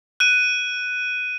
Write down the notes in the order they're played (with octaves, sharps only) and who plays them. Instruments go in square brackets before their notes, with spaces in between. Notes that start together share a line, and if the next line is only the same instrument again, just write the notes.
[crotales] F#6 D#7